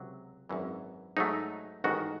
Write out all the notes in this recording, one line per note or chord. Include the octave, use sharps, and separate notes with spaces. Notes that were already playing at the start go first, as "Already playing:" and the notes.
Already playing: C#2 C3 F#3
G#1 F#2 E3
G#2 F#3 A3 D#4
A1 G#2 D#3 F#4